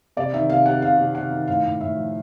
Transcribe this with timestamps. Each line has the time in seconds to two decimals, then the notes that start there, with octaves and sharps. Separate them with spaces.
0.17 C3 D5
0.33 D#3 E5
0.50 C3 F5
0.66 C3 F#5
0.82 C3 F5
0.99 C3
1.15 C3 F#5
1.31 D#3
1.47 A2 F5
1.64 A2
1.81 A2 E5
1.97 F3